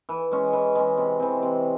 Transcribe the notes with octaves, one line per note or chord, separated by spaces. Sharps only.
E3
G#3 C#4
E3
G#3 C#4
C3
E3 C4
C3